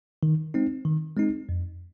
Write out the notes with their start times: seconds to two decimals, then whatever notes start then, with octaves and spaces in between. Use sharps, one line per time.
0.23 D#3
0.54 G#3 C4 D#4
0.85 D#3
1.16 G#3 C4 D#4
1.49 F2